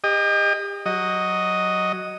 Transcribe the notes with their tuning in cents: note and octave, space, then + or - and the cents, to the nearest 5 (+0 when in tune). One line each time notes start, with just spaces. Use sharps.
G4 +35 D#5 -10
F#3 +0 D#5 +0